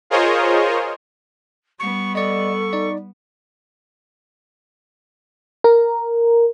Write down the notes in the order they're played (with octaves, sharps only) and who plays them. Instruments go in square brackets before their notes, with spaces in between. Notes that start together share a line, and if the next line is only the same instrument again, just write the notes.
[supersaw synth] F4 G#4 A#4 C5 C#5 D#5
[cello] G3 B3 [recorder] C#6
[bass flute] A4 [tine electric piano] D5 D#5 [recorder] C#6
[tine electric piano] D#4 D5
[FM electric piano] A#4